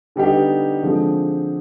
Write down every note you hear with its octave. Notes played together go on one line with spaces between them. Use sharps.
D3 G3 B3 D#4 G4
D3 F3 G#3 C4